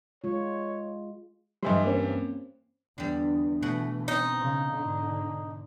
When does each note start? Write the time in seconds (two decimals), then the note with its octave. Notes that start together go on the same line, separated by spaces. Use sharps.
0.24 G#3 F4 C#5
1.63 G2 E3 G3 D#5 E5 C6
1.85 A#3 C4 C#4
2.98 E2 D3 G3
3.62 B2 E3 A3 F#5
4.08 C4 D#4
4.41 C#3
4.73 G#2 D3